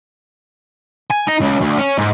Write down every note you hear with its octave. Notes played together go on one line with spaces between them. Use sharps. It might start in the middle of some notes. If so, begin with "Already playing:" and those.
G#5
D#4
C#2
D2
C#4
G#2